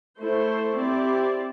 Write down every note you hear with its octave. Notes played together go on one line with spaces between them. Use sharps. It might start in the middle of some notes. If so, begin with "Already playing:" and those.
A3 E4 C5
C4 E4 G4 D5